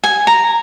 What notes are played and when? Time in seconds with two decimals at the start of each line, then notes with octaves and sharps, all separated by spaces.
0.04 G#5
0.27 A#5